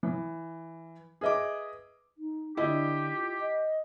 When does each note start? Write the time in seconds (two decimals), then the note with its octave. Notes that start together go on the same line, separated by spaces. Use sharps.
0.03 E3
1.21 G#4 B4 D#5 E5 D6
2.17 D#4
2.57 D3 E4 G4 D#5
3.13 F4
3.38 D#5